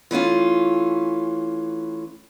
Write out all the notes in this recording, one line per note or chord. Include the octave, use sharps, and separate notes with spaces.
E3 A3 C#4 F4